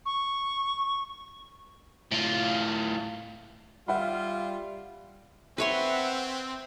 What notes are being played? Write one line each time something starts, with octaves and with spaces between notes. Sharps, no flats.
C#6
A2 F4
G3 F4 E5 F#5 B5
C4 B4 C#5 E5 F#5 C6